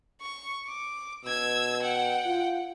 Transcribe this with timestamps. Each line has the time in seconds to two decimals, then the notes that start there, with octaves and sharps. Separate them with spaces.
0.22 C#6
0.68 D6
1.25 B2 E6 G#6
1.83 F#5 G5
2.26 F4